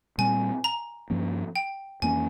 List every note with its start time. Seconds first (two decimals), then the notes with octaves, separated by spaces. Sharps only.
0.18 A#2 G3 C4 G#5
0.64 A#5
1.10 G2 F3 A#3 C#4
1.56 G5
2.02 F2 E3 A#3 C#4 G#5